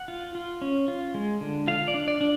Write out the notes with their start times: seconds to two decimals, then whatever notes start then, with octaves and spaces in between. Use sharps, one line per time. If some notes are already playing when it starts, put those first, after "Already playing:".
Already playing: F#5
0.08 F4
0.35 F4
0.62 C#4
0.88 F4
1.14 G#3
1.41 D3
1.68 F4 F5
1.88 D5
1.94 D4
2.08 D5
2.21 D4